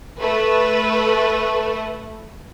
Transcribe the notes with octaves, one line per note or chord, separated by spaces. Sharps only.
A3 B4